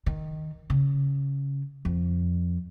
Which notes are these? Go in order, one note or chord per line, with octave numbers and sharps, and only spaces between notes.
D#3
C#3
F2